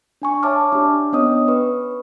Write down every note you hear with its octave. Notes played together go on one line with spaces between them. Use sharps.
D4 G#5 C#6
C#5 E5 A5 C#6 D6 F6
D4 G4
B3 C#4 D4 C#5 D#5 D#6
B4 C#6